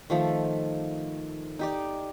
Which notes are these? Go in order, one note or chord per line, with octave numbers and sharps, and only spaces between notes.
D#3 F3 A3
D#4 G4 D5